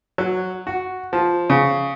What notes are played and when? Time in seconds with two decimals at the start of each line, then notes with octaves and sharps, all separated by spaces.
0.18 F#3
0.67 F#4
1.13 F3
1.50 C#3